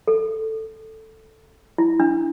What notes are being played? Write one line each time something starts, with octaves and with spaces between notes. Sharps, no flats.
A4
E4
D4